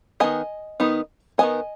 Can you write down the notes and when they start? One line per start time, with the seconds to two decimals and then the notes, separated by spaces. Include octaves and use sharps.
0.20 D#3 B3 D#4 D#5 G#5
0.80 D#3 B3 D#4
1.38 D#3 B3 D#4 D#5 G#5